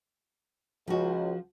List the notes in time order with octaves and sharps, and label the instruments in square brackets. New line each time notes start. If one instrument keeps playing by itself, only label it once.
[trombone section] C#2 G#3 [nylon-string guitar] F3 F#4